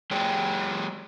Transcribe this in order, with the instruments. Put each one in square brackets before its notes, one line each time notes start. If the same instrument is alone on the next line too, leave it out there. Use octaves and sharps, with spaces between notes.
[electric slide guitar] F#3 G#3 G4